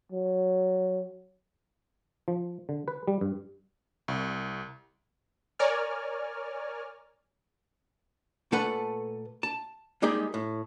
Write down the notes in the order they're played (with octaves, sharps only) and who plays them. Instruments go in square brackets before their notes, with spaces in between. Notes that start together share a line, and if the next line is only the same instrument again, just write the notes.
[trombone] F#3
[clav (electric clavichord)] F3
D3
B4
G3
G2
[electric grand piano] C2
[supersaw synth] A#4 C#5 D5 G#5 F6
[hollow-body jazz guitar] A#2 A3 A4 B4 F#5
A5
G3 G#3 A#3 D#4 G4 G#4
A2